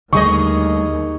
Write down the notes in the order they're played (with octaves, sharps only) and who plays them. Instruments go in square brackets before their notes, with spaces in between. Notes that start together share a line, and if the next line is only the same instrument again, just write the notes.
[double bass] D#2 [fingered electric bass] D3 G3 A3 [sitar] D#4 G#4 D#5 [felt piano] C#6